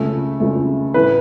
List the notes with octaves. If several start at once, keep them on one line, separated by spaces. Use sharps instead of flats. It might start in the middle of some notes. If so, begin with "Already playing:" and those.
Already playing: C#2 C#3 A3 A4
C#2 C#3 A3
A2 E3 A3 B4